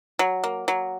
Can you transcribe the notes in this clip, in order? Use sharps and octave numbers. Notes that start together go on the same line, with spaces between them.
F#3
A#3
F#3